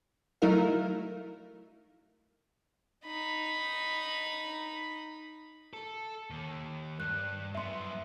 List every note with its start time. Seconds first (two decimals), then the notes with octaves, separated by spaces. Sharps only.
0.42 F#3 A3 D#4 E4 A#4 F5
3.05 D#4 B5
5.73 A4
6.30 D#2
7.00 G2 F#6
7.55 F#2 B3 E5 C6